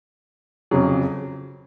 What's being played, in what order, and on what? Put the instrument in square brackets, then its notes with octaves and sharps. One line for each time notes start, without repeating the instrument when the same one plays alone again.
[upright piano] F2 C#3 F#3